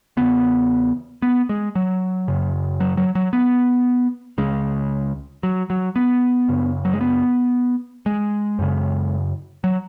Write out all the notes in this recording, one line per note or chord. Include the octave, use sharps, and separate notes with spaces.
E2 C#3 B3
B3
G#3
F#3
F#2 C#3
F#3
F#3
F#3
B3
C#2 C#3 G#3
F#3
F#3
B3
F#2 C#3
F#3
G#3
B3
G#3
F#2 C#3
F#3